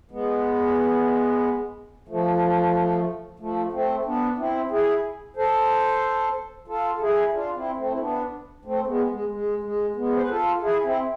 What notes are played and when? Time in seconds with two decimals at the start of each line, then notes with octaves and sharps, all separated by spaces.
0.11 G#3 B3
2.08 F3 A3
3.39 F3 A3
3.72 A3 C4
4.05 B3 D4
4.38 C4 E4
4.71 E4 G#4
5.36 A4 C5
6.68 F4 A4
6.97 A4
7.01 E4 G#4
7.33 D4 F4
7.55 C4 E4
7.77 A3 C4
7.90 E4
7.99 B3 D4
8.65 A3 C4
8.87 G#3 B3
9.10 G#3
9.31 G#3
9.63 G#3
9.96 G#3 B3
10.15 C5
10.22 B4
10.29 F4 A4
10.62 E4 G#4
10.84 C4 E4